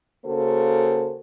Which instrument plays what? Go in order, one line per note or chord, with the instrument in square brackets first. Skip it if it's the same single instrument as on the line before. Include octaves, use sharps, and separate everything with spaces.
[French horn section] C#3 A#3 F#4 A4 A#4 C5